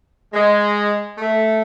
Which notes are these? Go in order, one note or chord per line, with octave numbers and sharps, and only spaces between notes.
G#3
A3